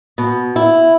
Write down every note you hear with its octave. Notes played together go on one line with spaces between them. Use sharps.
B2
E4